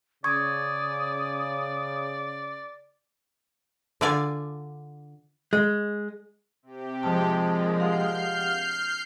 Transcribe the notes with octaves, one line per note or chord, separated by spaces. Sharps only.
C#3 D5 C#6 D#6 G#6
D3 F4 D5 G#5
G#3
C3 G4
F3 G#3 A5
D4 A#4
G4 F5 F#5 F6 G6 C7